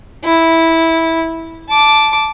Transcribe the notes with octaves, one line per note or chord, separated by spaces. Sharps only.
E4
A5 D6